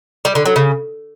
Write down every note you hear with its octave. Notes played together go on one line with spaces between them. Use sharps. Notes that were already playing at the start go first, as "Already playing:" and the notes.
G3
D3
F#3
C#3